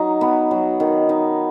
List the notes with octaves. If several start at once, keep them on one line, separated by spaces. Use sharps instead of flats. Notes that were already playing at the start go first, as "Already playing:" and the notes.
Already playing: F#3 D#4
B3
F#3
D#3
D#4